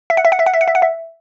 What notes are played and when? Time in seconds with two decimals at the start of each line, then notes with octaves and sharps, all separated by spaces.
0.10 E5
0.17 F#5
0.25 E5
0.32 F#5
0.39 E5
0.46 F#5
0.54 E5
0.61 F#5
0.68 E5
0.75 F#5
0.82 E5